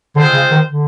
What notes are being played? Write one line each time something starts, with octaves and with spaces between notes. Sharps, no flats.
D3 G#3 C4 F4 G#4 C5
C#3
D#3
D3